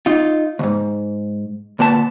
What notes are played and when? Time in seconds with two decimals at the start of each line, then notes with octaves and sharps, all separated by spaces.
0.06 D#4 F4
0.59 D2 G#2
1.79 D2 A#2 B3 A5